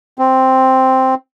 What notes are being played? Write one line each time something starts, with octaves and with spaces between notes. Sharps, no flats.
C4